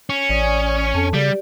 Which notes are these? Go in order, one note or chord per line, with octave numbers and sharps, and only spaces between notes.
C#4
A1 D5 G#5 D#6
F2 A4 A5
C#3 G3 G4 D5